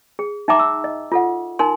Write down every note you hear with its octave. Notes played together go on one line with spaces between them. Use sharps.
G#4
D#4 E5 G5 A#5 D6
E6
D#5
F4 A4 F#5
D#4 A#4 G#5 C6